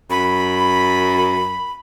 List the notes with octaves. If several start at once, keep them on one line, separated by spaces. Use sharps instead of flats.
F#2 B5